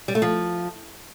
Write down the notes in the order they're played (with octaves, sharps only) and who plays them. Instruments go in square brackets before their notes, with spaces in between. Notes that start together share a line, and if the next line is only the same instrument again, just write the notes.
[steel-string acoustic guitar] G3
A3
F3